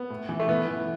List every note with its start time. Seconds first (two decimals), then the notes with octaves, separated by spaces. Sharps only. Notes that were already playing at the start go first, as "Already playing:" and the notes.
Already playing: B3
0.10 A2
0.29 E3
0.40 A3
0.49 E3 B3
0.68 E3